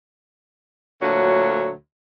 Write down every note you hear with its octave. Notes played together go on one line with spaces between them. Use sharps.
D2 A#2 D3 F#3 C#5